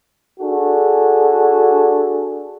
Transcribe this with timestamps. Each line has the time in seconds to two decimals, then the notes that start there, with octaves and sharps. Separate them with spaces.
0.40 D4 F#4 G#4 A4